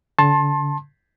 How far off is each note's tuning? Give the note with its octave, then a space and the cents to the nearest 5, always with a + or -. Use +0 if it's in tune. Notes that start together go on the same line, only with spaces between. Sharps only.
D3 -40 A5 +0 C6 +30